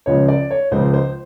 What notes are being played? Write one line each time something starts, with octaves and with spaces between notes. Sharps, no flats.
C#2 C#3 F3 G#3 C#5
D5
C#5
C#2 C#3 F3 G#3 C5
C5